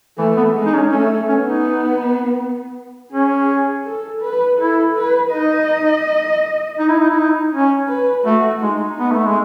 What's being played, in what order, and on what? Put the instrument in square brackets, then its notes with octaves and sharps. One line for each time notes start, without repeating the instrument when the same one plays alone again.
[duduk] E3 [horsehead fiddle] A3
[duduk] B3
[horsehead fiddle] G#3
[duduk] D#4
C#4
[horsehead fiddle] A3 [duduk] C#4
[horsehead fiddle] B3 [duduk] C#4
[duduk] D#4
[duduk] C#4 [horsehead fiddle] G#4
[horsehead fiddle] A4
B4
[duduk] E4 [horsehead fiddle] A4
[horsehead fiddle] B4
[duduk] D#4 [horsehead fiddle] D#5
[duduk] D#4
E4
D#4
E4
D#4
C#4
[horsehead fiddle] B4
[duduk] A3 [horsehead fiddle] F#4
[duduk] G#3 [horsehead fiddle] D#4
[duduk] B3
A3
G#3